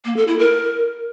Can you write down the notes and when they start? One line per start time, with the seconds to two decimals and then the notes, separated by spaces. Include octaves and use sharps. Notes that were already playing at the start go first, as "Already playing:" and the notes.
0.05 A#3
0.16 A4
0.28 E4
0.39 A#4